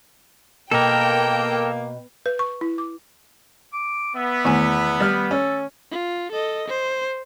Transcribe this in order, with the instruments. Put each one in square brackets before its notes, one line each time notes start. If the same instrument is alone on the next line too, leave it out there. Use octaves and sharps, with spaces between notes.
[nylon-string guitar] B2 [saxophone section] A#3 [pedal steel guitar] A4 A#4 [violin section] G5
[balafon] B4
C#6
E4
D6
[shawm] D6
[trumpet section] B3 [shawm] E5
[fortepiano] E2 [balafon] D#3 A3 G#5
[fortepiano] G3 F6
[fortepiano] C#4 [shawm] A4
[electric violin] F4
A4 D#5
C5